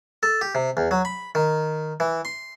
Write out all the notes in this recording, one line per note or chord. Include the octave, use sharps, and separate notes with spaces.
A4
G4
C3
E2
F#3
B5
D#3
E3
C6